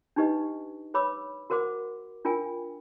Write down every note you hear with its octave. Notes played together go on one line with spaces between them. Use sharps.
D4 D#4 G4 B4 D#5
B4 C#5 B5 D6 E6
F#4 A#4 C5 F#5 D6
D4 F4 A#4 G5 G#5